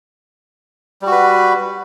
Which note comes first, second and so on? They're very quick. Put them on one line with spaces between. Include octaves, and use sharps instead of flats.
G3 F#4 B4